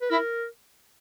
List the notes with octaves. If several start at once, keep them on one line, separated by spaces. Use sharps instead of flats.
B4
E4 A#4